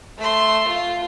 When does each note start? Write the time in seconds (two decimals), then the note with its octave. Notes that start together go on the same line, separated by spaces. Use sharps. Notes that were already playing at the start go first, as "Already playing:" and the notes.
0.18 A3 C6
0.68 F4